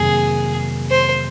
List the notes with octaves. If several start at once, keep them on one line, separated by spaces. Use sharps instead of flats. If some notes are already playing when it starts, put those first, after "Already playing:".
Already playing: F2 C3 D#3 F#3 A#3 G#4
C5